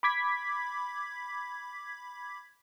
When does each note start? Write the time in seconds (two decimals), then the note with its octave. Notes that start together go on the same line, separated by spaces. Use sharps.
0.03 B5 D6 G#6 B6